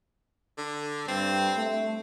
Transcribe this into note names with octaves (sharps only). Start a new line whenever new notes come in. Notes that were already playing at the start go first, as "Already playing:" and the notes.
D3
G2 C4
A3